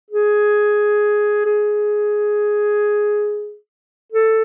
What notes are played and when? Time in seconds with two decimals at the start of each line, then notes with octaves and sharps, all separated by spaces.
0.10 G#4
1.45 G#4
4.12 A4